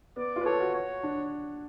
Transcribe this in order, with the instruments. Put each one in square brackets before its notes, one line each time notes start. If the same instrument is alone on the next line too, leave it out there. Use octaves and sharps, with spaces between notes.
[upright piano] B3 [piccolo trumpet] D5
[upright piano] F4
B4
[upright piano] A4 [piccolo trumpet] C#5
[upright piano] F#4
[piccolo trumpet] C#5
[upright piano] D4